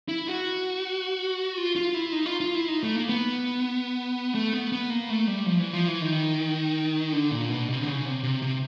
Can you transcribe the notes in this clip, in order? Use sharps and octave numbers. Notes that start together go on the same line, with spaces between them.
E4
F#4
F4
F4
E4
D#4
F4
F4
E4
D#4
A3
A#3
B3
A3
B3
B3
A#3
A3
G3
F3
E3
F3
E3
D#3
D3
A#2
B2
C3
D3
C#3
C3
C3
C3